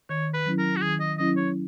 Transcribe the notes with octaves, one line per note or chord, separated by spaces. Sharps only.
D#3 C#5
B4
F#3 C#4 E4
A#4
F#4
D#3 G#4
D#5
F#3 C#4 E4 D#5
C#5